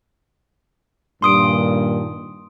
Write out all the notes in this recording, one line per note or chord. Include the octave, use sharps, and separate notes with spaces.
G2 A#2 D#3 C6 D#6 D7